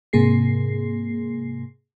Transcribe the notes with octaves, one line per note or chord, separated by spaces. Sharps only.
G#2 C3 A#3 G#4 C7